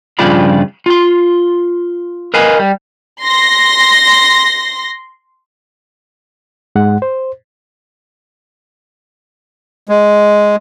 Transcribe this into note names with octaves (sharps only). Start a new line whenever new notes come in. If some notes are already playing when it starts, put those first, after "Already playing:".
G2 C#3 F3 F4 D5 B5
F4 C6
A#4 B4 D#5 F5 G#5 B5
G3
C6 A#6
G#2 G#3 F#5
C5
G#3